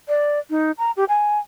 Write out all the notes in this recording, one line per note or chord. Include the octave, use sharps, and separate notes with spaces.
D5
D#4
A#5
G4
G#5